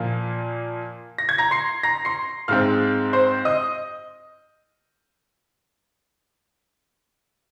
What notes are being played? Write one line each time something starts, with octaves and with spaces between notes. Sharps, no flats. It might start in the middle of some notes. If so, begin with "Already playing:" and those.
Already playing: A#2 F3 A#3 F5
A#6
G#6
A#5 A#6
C6 C7
A#5 A#6
C6 C7
G#2 G#3 C4 F5 F6
C5 C6
D#5 D#6